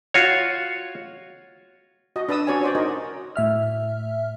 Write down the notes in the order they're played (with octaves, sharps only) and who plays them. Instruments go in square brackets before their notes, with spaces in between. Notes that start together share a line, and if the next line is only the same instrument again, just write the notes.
[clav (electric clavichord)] F4 F#4 C#5
[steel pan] F#4 D#5
D4 B4 A5 D#6 E6
C#4 F#4 C#5 D5 G#5
F#4 C5 D5
D#4 F#4 A#4 D#5
[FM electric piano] A2 E5 F6